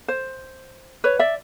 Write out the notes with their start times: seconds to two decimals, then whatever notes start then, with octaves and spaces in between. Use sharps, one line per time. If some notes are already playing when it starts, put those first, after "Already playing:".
0.08 C5
1.04 B4 C#5
1.19 D5 E5